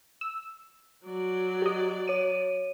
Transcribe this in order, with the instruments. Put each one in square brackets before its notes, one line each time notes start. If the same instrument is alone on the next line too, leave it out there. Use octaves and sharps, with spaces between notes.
[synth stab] E6
[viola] F#3 D5
[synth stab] G4 D#5
[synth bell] C#5 D#7